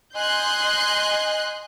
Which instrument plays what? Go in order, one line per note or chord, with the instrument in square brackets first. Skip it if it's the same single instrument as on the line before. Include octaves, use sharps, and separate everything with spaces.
[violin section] D#5 G#5 C6 F#6 G6